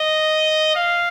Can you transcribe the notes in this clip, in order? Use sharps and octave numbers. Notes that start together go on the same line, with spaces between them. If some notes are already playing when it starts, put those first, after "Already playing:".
Already playing: D#5
F5